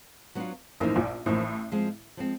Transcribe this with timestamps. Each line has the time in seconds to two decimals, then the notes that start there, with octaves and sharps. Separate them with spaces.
0.35 F#3 B3 D4 F4
0.80 A1 A2 F3 A#3 D#4
0.96 A#1 A#2
1.26 A1 A2 F3 A#3 D#4
1.72 F3 G#3 C4
2.17 F3 G#3 C4